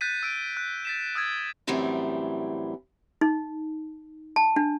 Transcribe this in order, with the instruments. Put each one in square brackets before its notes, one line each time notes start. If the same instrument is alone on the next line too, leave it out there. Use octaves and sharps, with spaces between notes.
[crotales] F#6 G6 A6 B6 D#7
E6 D7
F#6
A6 B6 E7
D#6 E6 F#6 G#6 A6
[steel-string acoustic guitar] F#2 A2 E3 G3 C4 A#4
[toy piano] D#4
A5
D4